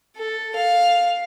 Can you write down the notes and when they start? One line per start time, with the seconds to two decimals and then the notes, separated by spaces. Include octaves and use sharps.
0.16 A4
0.55 F5